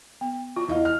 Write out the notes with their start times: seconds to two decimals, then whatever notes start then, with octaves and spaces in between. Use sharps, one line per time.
0.21 B3
0.56 F4
0.68 E2 D#5 F5
0.85 F6